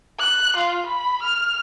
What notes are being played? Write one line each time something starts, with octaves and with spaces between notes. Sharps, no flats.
F#6
F4
B5
F6